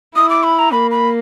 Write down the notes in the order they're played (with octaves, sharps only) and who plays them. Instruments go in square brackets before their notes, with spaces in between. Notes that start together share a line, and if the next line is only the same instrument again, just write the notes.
[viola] E4 [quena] D#6
[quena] D6
B5
A#5
[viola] A#3 [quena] B5
[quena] B5